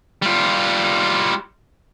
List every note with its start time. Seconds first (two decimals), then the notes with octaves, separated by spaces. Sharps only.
0.22 G3 F4